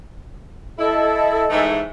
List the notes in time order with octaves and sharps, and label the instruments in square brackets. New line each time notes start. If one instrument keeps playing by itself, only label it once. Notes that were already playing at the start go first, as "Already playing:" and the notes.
[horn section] E4 [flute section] A4 D#5
[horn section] G#2 E3 A3